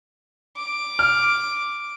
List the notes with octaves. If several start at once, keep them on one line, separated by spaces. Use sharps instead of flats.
D6
F6